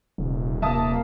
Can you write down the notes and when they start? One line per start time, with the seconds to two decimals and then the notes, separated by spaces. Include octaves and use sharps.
0.18 D#1 C3
0.62 C3 A#3 E5 A5 D#6